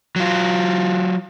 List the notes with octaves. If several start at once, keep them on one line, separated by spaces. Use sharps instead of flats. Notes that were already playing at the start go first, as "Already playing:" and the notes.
F#3 F4